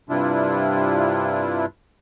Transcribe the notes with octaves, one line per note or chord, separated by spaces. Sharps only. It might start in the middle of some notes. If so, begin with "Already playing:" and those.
G2 C3 G3 D4 E4 F4